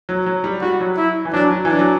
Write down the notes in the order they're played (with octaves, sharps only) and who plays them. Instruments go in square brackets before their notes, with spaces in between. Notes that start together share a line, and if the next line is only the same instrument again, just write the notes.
[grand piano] F#3
F#3
G3
[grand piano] G3 [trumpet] F#4
[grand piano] F#3
[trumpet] E4
[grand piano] E3
[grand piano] F#3 [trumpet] D4
[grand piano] F#3
[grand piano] E3 [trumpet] D4
[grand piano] F#3